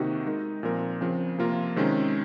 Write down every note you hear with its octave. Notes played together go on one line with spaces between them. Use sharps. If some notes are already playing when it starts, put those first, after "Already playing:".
Already playing: C3 D#3 A#3 D#4 F#4
G#3 D#4 A#4
A#2 F3 C4 F4 A#4
C#3 F3 C4 F4 A#4
C3 F3 A#3 F4 A#4
C3 D#3 G#3 C#4